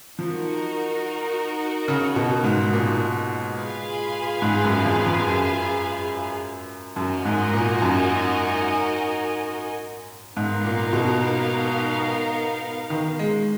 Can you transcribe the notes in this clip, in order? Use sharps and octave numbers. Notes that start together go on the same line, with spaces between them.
F3 D#4 F#4 A#4
C#3
B2
G#2
A#2
F4 G#4 B4 F5 G#5
G#2
F#2
F2
F2
F#2
F#2 D#4 F#4 A#4 D#5 G#5
G#2
A#2
F#2
G#2 B3 D#4 A#4 F5
A#2
B2
D#3
G#3